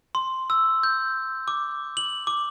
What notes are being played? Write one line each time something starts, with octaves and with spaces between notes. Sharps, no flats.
C6
E6
G6
D6
F#7
D6